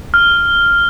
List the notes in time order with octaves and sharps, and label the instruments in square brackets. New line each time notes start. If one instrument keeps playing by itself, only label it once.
[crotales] F6